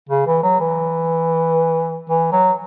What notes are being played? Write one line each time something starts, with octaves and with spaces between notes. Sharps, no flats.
C#3
E3
F#3
E3
E3
F#3